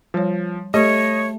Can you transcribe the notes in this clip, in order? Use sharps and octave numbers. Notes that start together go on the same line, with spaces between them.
F3 G3 C#5
A3 G4 C#5 D#5